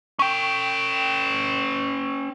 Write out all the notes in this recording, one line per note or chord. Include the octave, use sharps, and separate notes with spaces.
C#4 G5